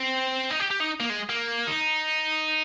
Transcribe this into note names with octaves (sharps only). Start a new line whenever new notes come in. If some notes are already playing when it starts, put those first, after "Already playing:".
Already playing: C4
D#4
G4
G4
D#4
A#3
G#3
A#3
D#4